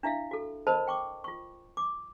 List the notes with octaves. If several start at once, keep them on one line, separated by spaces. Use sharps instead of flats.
D4 E4 E5 F5
F#4 A4
A#4 C5 D#5 A5 B5
G5 C#6 D6
F4 C#6
D6